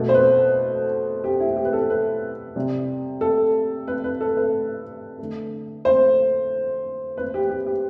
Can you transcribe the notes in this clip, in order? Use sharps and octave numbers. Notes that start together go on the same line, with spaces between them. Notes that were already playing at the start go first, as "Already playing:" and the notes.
Already playing: B2 A3
C5
B4
G4
E4
G4
B4
A4
B4
C3 G3
A4
B4
B4
A4
B4
D3 A3
C5
B4
G4
G4
G4